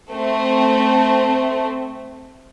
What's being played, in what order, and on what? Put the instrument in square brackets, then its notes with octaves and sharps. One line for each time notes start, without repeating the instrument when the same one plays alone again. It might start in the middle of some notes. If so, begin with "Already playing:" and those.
[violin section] A3 C4